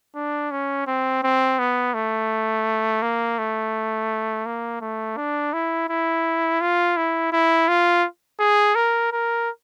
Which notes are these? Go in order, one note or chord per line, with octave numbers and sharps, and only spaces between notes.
D4
C#4
C4
C4
B3
A3
A#3
A3
A#3
A3
D4
E4
E4
F4
E4
E4
F4
G#4
A#4
A#4